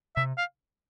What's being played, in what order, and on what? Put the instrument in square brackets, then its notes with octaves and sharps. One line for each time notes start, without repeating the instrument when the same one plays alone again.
[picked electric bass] C3 [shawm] E5
[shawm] F5